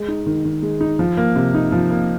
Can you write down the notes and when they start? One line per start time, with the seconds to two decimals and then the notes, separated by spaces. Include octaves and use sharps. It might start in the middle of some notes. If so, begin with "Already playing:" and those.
Already playing: G#3
0.08 D#4
0.26 D#3
0.45 D#3
0.62 G#3
0.81 D#4
0.99 F3
1.17 A#3
1.36 C3
1.54 D#4
1.72 F3
1.90 A#3